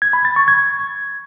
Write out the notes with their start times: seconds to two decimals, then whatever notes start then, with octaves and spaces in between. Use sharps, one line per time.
0.02 G#6
0.13 B5
0.25 A6
0.36 C#6
0.48 G#6